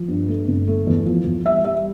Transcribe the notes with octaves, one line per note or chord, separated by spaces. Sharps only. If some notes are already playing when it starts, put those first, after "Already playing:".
Already playing: F3
G2
A3
G1
A3
E2
F3
E2
G3 E5
G3 E5